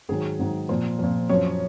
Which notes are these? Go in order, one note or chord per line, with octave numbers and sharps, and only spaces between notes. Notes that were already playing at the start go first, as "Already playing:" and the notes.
G#2 D#3 F#3 G#4
G#2 D#3 F#3
A#2 F3 C5
A#2 F3
F#2 F3 C#5